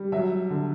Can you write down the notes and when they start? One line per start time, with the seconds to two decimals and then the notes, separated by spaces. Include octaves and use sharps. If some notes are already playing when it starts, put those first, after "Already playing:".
Already playing: G3
0.12 F#3 E5
0.50 D3